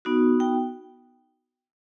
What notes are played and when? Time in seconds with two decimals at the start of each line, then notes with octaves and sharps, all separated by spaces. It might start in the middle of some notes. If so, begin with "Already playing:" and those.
0.05 B3 D#4 F#4
0.40 G5